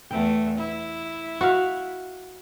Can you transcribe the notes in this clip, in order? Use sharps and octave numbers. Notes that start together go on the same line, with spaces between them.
E2 A3 G5
E4
F#4 F5